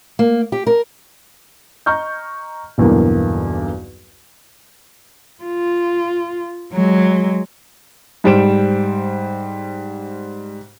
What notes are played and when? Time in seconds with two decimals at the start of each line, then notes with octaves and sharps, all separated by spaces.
0.19 A#3
0.52 G4
0.67 A#4
1.86 D#5 A#5 C#6 F6 G6
2.78 B1 E2 G2 D3 A#3
5.43 F4
6.72 F#3 G#3
8.24 G#2 G3 C5 D7 E7